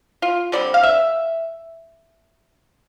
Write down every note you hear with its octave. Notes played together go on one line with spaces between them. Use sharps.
F4
D3 G3 C4 D5
F5
E5